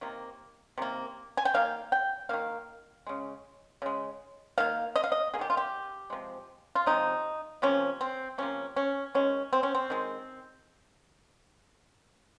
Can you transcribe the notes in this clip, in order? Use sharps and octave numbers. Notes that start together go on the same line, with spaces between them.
C3 D#3 A#3
C3 D#3 A#3
G#5
G5
D#3 A#3 F5
G5
D#3 A#3 F5
C#3 G#3
C#3 G#3
D#3 A#3 F5
D#5
F5
D#5
A#3 G#4
D#3 G4
F4
G4
C3 F3 G#3
F4
C3 F3 G#3 D#4
C3 F3 A#3 C#4
C4
C3 F3 A#3 C#4
C#4
D#3 G#3 C#4
C4
C#4
C4
D#3 G#3